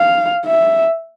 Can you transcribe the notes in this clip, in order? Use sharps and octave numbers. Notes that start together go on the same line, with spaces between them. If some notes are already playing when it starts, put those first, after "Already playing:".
Already playing: F5
E5